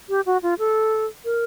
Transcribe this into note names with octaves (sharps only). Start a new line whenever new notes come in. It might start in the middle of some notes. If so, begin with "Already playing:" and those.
G4
F#4
F4
A4
A#4